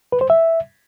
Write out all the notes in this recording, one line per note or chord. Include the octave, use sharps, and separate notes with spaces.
B4
C5
E5